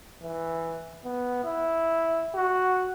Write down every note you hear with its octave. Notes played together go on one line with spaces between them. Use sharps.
E3
B3
E4
F#4